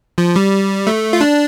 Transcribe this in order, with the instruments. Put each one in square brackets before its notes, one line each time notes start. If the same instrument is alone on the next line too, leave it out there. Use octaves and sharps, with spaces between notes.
[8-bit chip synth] F3
G3
A3
F4
D4